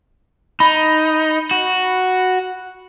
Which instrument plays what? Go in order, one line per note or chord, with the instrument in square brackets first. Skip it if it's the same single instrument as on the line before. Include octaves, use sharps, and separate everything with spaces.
[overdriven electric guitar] D#4 [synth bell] B5
[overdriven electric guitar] F#4